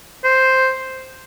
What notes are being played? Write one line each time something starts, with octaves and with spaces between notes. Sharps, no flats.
C5